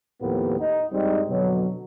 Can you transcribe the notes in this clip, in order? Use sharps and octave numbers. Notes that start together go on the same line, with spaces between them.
D#2 A2 F3 A#3 B3 G4
D#4
G2 G3 G#3 C4 D#4
F2 B2 D3 F#3